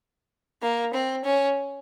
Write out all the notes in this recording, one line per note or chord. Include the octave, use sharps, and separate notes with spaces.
A#3
C4
C#4